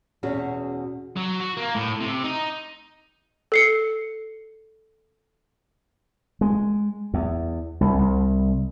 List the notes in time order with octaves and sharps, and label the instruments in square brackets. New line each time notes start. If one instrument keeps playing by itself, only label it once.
[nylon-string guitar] E2 B2 C#4 F#4 G#4
[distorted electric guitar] F#3
F#4
A#3
A2
C3
D#4
[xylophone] A4 C7 C#7
[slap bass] G#3
E2
C2
C2